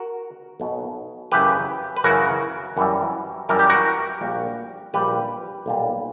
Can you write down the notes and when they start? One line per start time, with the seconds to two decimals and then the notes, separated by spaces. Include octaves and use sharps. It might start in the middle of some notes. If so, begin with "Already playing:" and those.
Already playing: F#4 A#4
0.60 B1 B2 F#3
1.32 F#2 C#3 E3 G4 B4
1.97 B4
2.04 F#2 C#3 E3 F#4 A#4
2.77 F#2 E3 G3
3.49 F#2 E3 G3 A#4
3.59 G4
3.69 F#4 A#4
4.21 A#1 A#2 G3
4.93 A#1 A#2 G3 G4 B4
5.66 B1 A#2 G3